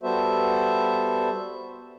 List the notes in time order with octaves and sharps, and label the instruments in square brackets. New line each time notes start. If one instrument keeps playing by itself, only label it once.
[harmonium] G3 B3 F#4 A4 C5 E5